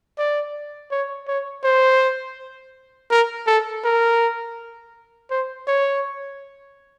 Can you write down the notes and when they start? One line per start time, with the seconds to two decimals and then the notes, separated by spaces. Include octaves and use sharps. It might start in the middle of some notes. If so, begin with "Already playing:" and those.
0.18 D5
0.91 C#5
1.28 C#5
1.64 C5
3.10 A#4
3.47 A4
3.84 A#4
5.30 C5
5.67 C#5